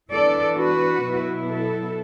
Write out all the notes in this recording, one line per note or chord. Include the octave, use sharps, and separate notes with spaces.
E3 B3 D4 A4 D5
F#4 B4
B2 F#3 B3 E4
A4